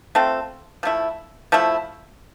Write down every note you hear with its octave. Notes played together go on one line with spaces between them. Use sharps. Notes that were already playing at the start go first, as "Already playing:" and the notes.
A3 C4 F4 A4
F3 A3 E4
F3 A3 E4